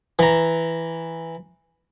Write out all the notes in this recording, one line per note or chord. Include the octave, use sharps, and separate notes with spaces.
E3 A#5